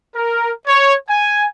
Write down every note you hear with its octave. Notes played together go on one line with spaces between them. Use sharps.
A#4
C#5
G#5